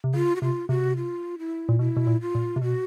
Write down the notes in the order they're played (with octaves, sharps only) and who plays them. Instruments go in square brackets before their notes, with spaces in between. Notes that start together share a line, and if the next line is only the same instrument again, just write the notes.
[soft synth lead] C3
[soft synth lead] C#3 [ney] F4
[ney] F#4
[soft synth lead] C3 [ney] F4
[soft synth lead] C3 [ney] F#4
[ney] F4
E4
[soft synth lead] A#2
[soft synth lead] B2 [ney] E4
[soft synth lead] B2
A#2
[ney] F4
[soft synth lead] A#2
C3
[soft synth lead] B2 [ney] F#4